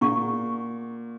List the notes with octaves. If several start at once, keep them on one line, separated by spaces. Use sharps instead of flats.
A#2 G#4 F#5 A#5 C#6